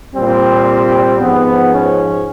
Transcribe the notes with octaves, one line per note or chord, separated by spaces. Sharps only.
A#2 G3 C4
G#2 F3 B3
C#4